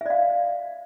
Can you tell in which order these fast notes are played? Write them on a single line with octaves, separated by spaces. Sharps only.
E5 D5 F5